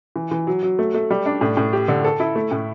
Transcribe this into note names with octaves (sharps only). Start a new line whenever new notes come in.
E3
E3
F#3
F#3
A3
A3
G3
D4
A2
A2
G4
D3
A4
E4
A3
A2